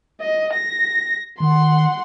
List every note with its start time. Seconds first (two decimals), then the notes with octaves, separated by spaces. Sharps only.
0.21 D#5
0.53 A#6
1.40 D#3 F#5 C6